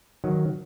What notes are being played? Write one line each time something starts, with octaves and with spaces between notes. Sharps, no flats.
D#3 F#3